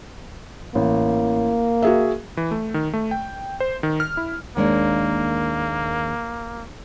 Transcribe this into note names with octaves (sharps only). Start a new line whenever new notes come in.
A1 A#3
F#4 G#4 E5
E3
A3
D#3
A3
G5
C5
D#3
F6
E4
D#2 G#3 A#3 D4